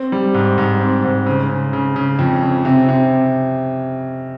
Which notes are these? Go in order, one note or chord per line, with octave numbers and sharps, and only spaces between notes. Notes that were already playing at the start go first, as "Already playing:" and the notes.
Already playing: C4
G3
G#2
G#2
C4
G#2
C#3
C#3
C#3
C#3
F2
C#3
C3
C3